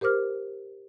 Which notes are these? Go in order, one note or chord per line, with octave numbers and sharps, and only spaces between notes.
G4 A#4 C5 D6 F6